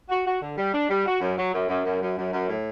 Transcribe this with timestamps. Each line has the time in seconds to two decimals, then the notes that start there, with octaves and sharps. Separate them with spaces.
0.09 F#4
0.26 F#4
0.41 D3
0.58 G3
0.73 D4
0.89 G3
1.06 F#4
1.21 F#2
1.38 F#3
1.54 F#2
1.69 F#2
1.85 F#2
2.02 F#2
2.17 F#2
2.33 F#2
2.49 A2